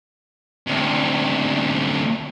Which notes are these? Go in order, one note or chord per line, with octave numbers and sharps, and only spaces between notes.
D2 C3